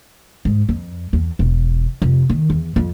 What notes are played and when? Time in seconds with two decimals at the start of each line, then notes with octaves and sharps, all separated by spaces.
0.45 G#2
0.69 F2
1.13 E2
1.39 E1
2.02 F1
2.30 D#3
2.50 E2
2.76 F2